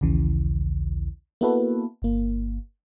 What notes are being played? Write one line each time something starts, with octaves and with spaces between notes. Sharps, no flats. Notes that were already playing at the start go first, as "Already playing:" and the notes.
A#1 D#2 C#3 E3
A#3 B3 E4 F#4 A4 B4
G1 A#3